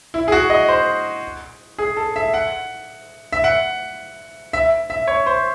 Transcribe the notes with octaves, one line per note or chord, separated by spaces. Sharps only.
E4
G#4
F#4
D#5
C5
G#4
A4
E5
F#5
E5
F#5
E5
E5
C#5
C5